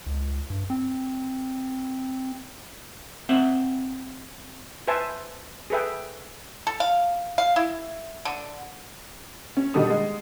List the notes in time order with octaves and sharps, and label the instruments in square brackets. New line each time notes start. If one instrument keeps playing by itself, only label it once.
[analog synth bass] C#2
G2
C4
[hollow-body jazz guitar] C4 E5 F#5
[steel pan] B4 C5 E5 G#5 A5
G#4 A4 B4 E5 G5
[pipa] A4
F5
F5
E4
D3
[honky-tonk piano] C#4
B2 D#3 G3 D4 A4 D#6
G#3